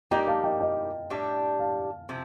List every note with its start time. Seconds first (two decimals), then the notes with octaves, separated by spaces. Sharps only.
0.11 G3 A#3 D#4 G4 G5 A#5
0.27 F5 A5
0.44 D#5 G5
0.60 D#5 G5
1.10 A2 G3 D4 G4
1.59 F5 A5
2.09 C3 F3 C4